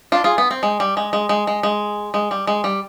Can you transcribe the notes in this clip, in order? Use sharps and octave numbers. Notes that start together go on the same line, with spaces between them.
D4 F4
F4 G#4
B3
C4
G#3
G3
G#3
G#3
G#3
G#3
G#3
G#3
G3
G#3
G3